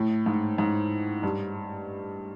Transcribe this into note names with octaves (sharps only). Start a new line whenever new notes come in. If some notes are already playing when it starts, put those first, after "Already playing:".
Already playing: A2
G#2
G#2
G2